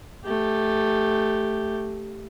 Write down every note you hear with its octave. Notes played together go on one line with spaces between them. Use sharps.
A3 G4